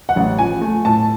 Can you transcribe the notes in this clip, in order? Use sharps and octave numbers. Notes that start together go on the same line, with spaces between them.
F#5
A1
F3 G#5
A3
A2 A5